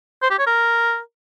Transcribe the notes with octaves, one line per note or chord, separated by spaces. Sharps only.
C5
G4
C#5
A#4